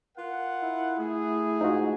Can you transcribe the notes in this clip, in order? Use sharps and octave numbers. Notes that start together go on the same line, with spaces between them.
F4 A#4 F#5
E4
A3 G#4
G#2 D#4 F4 F#4